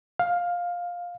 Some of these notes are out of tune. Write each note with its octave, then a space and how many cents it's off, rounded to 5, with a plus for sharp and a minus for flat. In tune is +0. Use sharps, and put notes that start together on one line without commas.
F5 +10